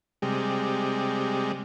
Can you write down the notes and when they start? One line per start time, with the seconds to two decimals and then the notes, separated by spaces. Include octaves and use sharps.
0.22 C3 G3 G#3